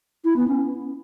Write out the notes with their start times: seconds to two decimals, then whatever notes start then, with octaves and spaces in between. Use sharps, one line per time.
0.25 E4
0.36 B3
0.48 C#4